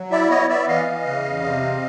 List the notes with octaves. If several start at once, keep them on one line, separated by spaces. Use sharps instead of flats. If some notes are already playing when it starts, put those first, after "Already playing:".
Already playing: F#3
E4 D5 E5
B3 C#5 D#5
B3 D5 E5
E3 D#5 F5
E3
C#3
E2
C3
C4